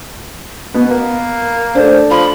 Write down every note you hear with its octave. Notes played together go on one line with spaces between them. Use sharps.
B2 B3
A#3
A3 D4 C5
F3 B5